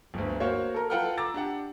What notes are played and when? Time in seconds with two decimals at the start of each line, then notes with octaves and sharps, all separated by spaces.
0.14 G1 D2
0.40 A#3 F#4 C5 C#5 F5
0.74 A4 A#4
0.90 F4 A4 B4 F#5 G5 F6
1.18 A#5 D6 E6 A6
1.34 D4 G4 F#5